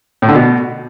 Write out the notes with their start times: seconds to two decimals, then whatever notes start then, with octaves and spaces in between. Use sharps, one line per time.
0.22 A2
0.29 D3
0.35 B2